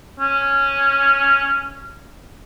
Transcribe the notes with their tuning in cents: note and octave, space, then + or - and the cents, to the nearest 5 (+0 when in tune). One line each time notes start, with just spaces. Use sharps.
C#4 -5